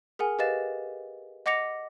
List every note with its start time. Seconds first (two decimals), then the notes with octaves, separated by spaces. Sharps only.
0.19 G#4 A#4 F#5 G#5
0.39 G4 B4 D#5 F5 A6 E7
1.46 D#5 F#5 D6 A#6 C#7 F7